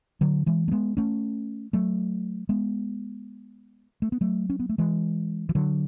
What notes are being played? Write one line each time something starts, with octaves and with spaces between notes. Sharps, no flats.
D3 F#3
E3 G#3
A3
G#3 B3
A3 C#4
F#3 A3
G#3 B3
A3
B3
F#3 A3
C#4
B3
A3
E3 G#3
E3
D3 F#3